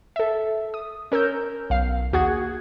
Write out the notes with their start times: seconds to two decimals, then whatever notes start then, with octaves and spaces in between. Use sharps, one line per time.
0.16 A4 E5
0.74 D#6
1.12 C#4 A#4 E6 G6
1.70 B1 F5 C7
2.13 D#2 F#4 G#4 F#5 G#6